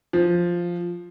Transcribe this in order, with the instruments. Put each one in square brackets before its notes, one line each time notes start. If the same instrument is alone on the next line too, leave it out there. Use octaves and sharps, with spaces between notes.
[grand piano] F3